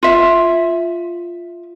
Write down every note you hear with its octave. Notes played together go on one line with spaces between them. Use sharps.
F4 E5